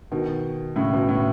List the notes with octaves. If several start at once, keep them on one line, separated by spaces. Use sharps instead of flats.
B2 D#3
A2 C#3
B2
A2